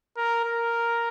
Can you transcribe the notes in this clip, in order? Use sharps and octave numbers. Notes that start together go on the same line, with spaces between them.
A#4
A#4